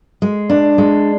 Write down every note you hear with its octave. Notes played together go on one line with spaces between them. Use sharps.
G#3
D4
G#3